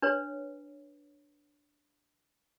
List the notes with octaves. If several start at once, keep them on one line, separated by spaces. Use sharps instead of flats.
D4 B4 C#5